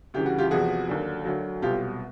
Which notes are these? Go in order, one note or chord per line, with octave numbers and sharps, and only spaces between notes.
D2 C#3 E3 G3 G4
F#4
F4 G4
E2 C3 F3 F#4 G#4
D#2 D3 F#3
D2 D3 F#3
C2 B2 F#3 F4 G4